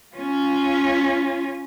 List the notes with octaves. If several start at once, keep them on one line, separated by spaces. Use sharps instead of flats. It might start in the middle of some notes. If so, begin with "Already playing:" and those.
C#4 F4